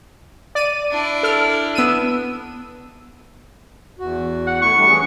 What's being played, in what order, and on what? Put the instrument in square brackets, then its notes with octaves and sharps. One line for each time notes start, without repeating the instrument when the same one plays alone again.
[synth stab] D5 D#7
[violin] D4 E4
[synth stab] A4 F6
B3 E6 D#7
[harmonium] E2 F#4
[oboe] F#5
[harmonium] A3 E4 [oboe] C#6
[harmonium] G3 A3 D4
E3 C#4 G#4